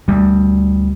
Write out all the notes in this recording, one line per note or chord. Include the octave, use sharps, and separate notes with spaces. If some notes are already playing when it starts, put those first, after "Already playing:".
D2 G3